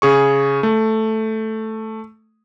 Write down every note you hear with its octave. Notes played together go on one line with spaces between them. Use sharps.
C#3 G#4 C#6
A3